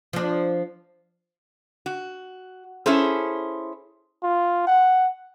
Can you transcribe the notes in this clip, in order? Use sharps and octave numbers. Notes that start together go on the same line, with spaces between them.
F3 D4
F#4
C#4 E4 G#4 A4 C5
F4
F#5